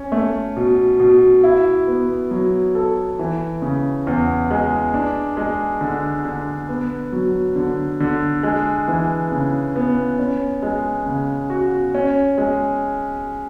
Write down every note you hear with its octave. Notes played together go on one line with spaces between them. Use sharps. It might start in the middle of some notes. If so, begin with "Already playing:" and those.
Already playing: C#4
A3
B2
B2
E4
B3
F#3
A4
E3
C#3
E2
G#3
D4
G#3
D3
D3
B3
F#3
D3
D3
G#3
E3
C#3
B3
C#4
G#3
C#3
F#4
C#4
G#3